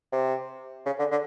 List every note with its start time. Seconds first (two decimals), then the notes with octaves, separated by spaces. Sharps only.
0.12 C3
0.86 C#3
0.99 D3
1.12 D3